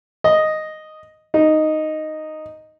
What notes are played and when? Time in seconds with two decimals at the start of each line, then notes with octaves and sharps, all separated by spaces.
0.24 D#5
1.34 D#4